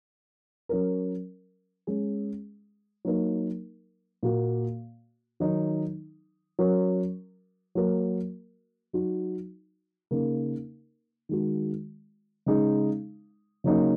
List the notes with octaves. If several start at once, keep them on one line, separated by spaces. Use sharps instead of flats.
F#3 C#4 A#4
G#3 C#4 G#4
F#3 A#3 D#4 A#4
A#2 A#3 F#4
D#3 F#3 D#4
F#3 C#4 F#4 A#4
F#3 A#3 F#4 A#4
F#3 D#4 F#4
C#3 A#3 D#4 A#4
D#3 G#3 F#4
C#3 G#3 D#4 G#4
C#3 F#3 A#3 D#4